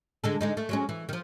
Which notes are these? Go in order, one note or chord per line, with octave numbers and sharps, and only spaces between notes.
D3 G#3 A4
D3 G#3 D#4
A3
F#3 G#3 C#4
E3
D#3 F3